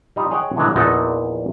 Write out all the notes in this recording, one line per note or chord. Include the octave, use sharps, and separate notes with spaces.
G3 D#4 F4
G#4 C#5 D#5 F#5 G5
A2 D3 E3 F#3 G#3
A#1 E2 A#2 D#4 F#4 A4